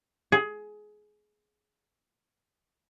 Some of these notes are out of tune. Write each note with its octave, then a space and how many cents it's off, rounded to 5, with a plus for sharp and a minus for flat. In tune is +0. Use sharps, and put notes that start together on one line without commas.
G#4 +20